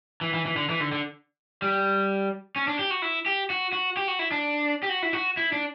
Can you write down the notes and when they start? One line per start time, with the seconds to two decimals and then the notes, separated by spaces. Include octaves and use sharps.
0.21 E3
0.34 E3
0.46 E3
0.56 D3
0.69 E3
0.80 D3
0.92 D3
1.62 G3
2.56 C#4
2.68 D4
2.79 G4
2.91 F#4
3.02 E4
3.26 G4
3.50 F#4
3.73 F#4
3.97 G4
4.08 F#4
4.19 E4
4.32 D4
4.83 G4
4.89 F#4
5.03 E4
5.13 F#4
5.37 E4
5.52 D4